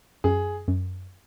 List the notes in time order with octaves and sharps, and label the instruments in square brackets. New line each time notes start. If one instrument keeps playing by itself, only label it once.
[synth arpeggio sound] F#2 [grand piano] G#4
[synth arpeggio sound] F#2